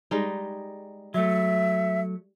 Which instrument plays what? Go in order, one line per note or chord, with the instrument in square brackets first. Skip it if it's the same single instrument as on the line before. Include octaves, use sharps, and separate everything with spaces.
[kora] G3 G#3 D#4
[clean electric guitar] F#3 A3 [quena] E5